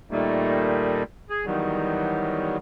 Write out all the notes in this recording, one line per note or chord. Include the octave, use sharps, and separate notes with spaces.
A#2 D#3 G3 A3 A#3
G#4
E2 D#3 F#3 G3